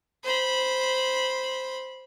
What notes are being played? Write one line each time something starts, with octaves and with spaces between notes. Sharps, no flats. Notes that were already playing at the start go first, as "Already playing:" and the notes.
C5 B5